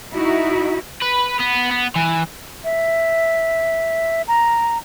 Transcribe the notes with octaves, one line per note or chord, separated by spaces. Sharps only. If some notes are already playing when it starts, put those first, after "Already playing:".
D#4 E4 F#4
B4
B3
B3
E3
E5
A#5